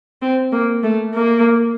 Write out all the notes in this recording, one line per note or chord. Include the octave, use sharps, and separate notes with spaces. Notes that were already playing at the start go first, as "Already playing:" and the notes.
C4
A#3
A3
A#3